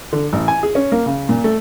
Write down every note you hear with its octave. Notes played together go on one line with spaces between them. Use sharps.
D3
A1
G#5
G#4
C#4
A#3
C#3
A#2
A3